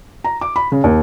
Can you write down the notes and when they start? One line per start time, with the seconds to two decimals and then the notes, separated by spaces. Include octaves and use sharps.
0.24 A#5
0.41 D6
0.56 B5
0.72 C#3
0.84 D#2